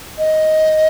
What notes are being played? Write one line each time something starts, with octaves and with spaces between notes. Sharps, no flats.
D#5